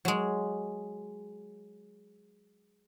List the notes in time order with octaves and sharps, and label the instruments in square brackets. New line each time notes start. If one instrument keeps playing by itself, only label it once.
[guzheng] F#3 G#3